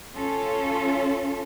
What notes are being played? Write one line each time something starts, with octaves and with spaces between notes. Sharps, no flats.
C#4 F4 A4